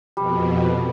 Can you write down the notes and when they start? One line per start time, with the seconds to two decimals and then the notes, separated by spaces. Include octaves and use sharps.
0.17 F2 B2 G3